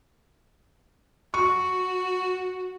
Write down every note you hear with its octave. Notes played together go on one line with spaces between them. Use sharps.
F#4 C#6